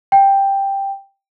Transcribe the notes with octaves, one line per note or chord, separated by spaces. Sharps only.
G5